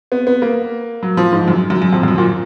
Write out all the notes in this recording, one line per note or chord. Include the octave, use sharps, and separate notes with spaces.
B3
B3
A#3
F#3
F3
G#2
F#2
F#2
F#2
F2
F2
F#2
A#2